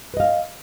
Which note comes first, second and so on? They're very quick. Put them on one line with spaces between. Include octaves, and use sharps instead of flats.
B4 D#5 F5